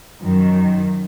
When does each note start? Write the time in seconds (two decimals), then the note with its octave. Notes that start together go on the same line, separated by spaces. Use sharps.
0.21 F#2 D#3